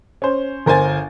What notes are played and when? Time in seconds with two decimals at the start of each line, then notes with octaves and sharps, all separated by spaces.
0.22 C#4 C5
0.66 G1 A#4 C5 G#5 A6